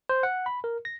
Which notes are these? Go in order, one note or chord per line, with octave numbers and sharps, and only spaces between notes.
C5
F#5
B5
A#4
A#6